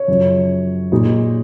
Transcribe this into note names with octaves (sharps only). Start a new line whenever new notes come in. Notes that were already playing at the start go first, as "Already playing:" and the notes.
Already playing: C#5
F#2 C#3 F3
A#2 G#3 D#4